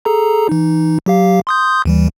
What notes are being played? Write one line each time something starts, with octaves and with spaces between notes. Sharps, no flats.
G#4 A4 A#5
E3 D#4
F#3 G4 F5
C6 D#6 G6
D#2 E3 G3